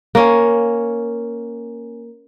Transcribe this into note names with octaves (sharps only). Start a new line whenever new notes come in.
A#3 C#4